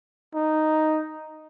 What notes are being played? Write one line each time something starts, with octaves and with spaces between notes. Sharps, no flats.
D#4